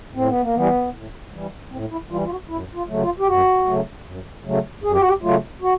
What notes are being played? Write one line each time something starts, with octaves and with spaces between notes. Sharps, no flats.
A2 C4
B3
A#3
E3 G3 B3
A2
E3 G3
A2 C4
E4
E3 G3 F4
F4
F#4
F#2 E4
F4
C#3 F#3 A3
F4
G4
F#2 F#4
C#3 F#3 A3
F#2
C#3 F#3 A3
F#2 G#4
G4
F#4
G4
C#3 F#3 A3 F4
F#4